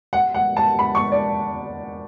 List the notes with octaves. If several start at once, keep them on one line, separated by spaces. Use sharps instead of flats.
F#5
F#5
A5
B5
C#6
D5